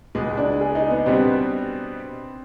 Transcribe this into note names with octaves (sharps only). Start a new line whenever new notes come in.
C#2 B2 G#3
D4
G#4
D#4
B3
B2 G3 B3 C4 D4